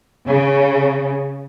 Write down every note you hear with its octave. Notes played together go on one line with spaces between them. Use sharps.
C#3